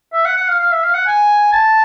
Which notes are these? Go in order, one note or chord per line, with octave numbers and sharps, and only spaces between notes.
E5
F#5
F#5
F5
F5
E5
F5
F#5
G#5
A5